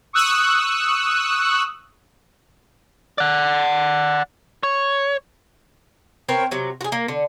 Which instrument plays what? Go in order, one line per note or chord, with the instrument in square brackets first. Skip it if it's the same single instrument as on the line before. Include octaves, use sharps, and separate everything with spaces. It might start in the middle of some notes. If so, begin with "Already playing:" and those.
[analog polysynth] C#6 D#6 E6 F#6
[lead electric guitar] D5 F#5
C#5
[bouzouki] C4 A#4 B4 C#5
C3 F#3
F#4 G#4
A#3
D3